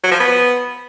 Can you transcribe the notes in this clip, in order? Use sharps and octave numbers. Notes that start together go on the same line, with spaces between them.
F#3
F3
B3